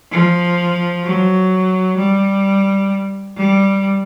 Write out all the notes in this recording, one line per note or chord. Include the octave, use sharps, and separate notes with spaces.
F3
F#3
G3
G3